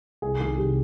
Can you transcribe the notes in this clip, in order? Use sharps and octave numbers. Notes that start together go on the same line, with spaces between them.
C2 G#4
C3 D#3 G#4
C2 G4